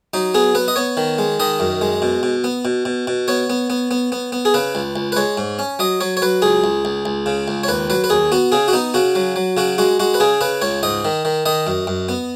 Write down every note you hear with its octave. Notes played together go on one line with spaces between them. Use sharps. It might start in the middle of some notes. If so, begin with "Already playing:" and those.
F#3 D#4
B3 G#4
B3 B4
D#5
B3 C#5
D#3
G#3
D#3 D#5
F#2
G#3
B2
B2
B3
B2
B2
B2
B3 C#5
B3
B3
B3
B3
B3
G#4
C#3 B4
C#2
C#2
B4
G#3 C#5
G#2
C#4
F#3 D#5
F#3 C#5
C#5
F#3 B4
C#2 G#4
C#2
C#2
C#2
C#3
C#2
C#5
D#2 B4
F#3 B4
B4
D#2 G#4
B3 F#4
C#3 G#4
F#4
B3 D#4
C#3 F#4
F#3
F#3
C#3 F#4
G#3 F#4
G#3 F#4
B4
C#3 G#4
C#3 B4
C#2 C#5
G#2 D#5
D#3
D#3
D#3 D#5
F#2
F#2
B3